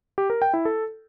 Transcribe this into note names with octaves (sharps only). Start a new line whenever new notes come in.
G4
A#4
G5
E4
A4